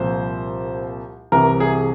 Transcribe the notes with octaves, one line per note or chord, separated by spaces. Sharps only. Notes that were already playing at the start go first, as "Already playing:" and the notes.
Already playing: C2 A#2 F3 C5
C2 C3 E3 A#4
G#4